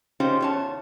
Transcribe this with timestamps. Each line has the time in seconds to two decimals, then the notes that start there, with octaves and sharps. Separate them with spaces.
0.20 C#4 D#4 F4 G4 G#4 C5
0.41 E2 C#5 A5